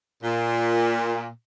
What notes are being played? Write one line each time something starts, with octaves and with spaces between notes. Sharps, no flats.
A#2